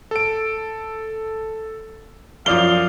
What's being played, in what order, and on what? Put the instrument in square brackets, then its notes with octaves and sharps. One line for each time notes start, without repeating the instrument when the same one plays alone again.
[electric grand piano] A4 D7
[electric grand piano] F#2 D5 D#6 [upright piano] F3 G7 [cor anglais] F5